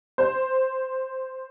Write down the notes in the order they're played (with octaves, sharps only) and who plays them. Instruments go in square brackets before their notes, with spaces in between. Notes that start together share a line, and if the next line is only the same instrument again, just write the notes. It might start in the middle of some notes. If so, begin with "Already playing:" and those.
[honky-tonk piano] C5